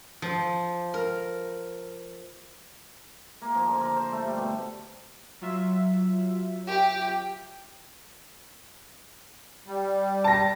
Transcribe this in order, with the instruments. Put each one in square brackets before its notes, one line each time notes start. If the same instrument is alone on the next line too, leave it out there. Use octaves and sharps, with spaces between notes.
[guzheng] F3
A#4
[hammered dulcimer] A#3
F3
D3
A#4
C5
A3
G3
B2
[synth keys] F#3 F4 E5
[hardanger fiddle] G4
[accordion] G3
[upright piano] A5 A#6